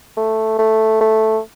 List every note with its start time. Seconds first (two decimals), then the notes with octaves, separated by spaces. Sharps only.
0.17 A3
0.59 A3
1.01 A3